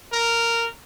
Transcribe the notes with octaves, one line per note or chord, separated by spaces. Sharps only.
A#4